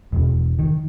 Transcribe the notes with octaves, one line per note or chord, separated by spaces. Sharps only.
E1
D#3